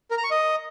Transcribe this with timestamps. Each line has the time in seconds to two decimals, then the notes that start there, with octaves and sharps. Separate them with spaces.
0.11 A#4
0.17 A#5
0.24 C#6
0.31 D#5